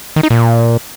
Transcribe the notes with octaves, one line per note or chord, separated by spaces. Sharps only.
D#3
D#4
A#2